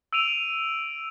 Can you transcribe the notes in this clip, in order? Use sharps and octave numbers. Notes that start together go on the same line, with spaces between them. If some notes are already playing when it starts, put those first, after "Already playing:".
E6 D7 D#7 F7